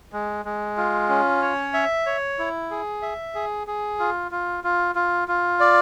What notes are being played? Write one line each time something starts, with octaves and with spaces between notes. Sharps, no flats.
G#3
G#3
F4
C#4
C#5
E5
C#5
E4
G#4
E5
G#4
G#4
F4
F4
F4
F4
F4
D5